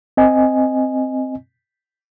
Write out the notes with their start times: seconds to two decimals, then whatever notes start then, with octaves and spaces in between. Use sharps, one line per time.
0.17 C4 D#5 G#5